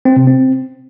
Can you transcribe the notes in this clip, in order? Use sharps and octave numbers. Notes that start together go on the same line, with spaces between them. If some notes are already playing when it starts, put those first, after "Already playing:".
C4
C3
C4